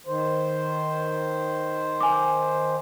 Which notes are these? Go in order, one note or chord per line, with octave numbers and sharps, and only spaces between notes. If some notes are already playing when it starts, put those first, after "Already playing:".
D#3 C5
G#5 D6